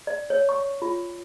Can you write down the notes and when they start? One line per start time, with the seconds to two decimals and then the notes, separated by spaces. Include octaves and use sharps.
0.07 D5
0.30 C#5
0.49 C#6
0.82 F4